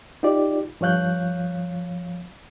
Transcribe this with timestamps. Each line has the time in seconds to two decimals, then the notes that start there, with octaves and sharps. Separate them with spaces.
0.23 D#4 F4 G4 D5
0.81 G2 F3 C#5 F5 F#6 G6